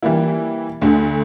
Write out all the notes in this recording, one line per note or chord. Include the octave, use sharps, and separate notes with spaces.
E3 G3 A#3 E4
D2 D3 A3